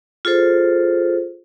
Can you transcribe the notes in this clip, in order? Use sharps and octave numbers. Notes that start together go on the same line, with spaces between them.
F4 G#4 A4 C5